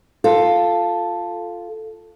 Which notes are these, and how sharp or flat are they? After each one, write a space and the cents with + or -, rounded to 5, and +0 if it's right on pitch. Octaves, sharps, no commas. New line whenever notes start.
F4 +0 A4 +0